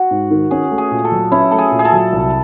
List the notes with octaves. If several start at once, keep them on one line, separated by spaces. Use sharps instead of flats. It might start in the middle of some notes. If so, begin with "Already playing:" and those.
Already playing: F#4
G#2
D#3
C#4 G#4
A3
G#4
A#2
A4
F#3
C#4 E4
A3 A4
G#4
A#2
G#4
A4
F#3
C2